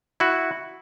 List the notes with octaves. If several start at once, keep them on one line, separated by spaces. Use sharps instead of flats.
E4 F#4